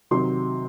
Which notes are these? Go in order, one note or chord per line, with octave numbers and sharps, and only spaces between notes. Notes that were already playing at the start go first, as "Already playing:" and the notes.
C3 D#3 F#3 C6